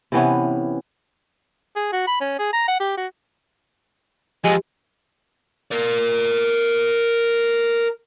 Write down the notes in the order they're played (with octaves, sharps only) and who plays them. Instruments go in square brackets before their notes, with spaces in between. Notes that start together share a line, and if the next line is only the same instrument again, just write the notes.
[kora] C3 E3 B3 C#4
[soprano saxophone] G#4
F#4
B5
C#4
G#4
A#5
F#5
G4
F#4
[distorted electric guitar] F2 [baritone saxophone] G#3 [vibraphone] G4
[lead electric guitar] A#4 D5